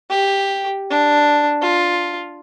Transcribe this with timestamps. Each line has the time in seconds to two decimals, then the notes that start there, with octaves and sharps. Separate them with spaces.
0.10 G4
0.90 D4
1.62 F4